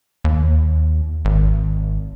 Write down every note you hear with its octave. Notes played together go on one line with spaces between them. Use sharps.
D#2
G#1